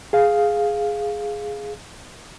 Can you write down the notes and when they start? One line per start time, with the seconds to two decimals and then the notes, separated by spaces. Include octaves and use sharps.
0.13 G#4 F5